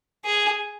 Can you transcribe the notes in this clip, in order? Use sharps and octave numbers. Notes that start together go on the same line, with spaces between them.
G#4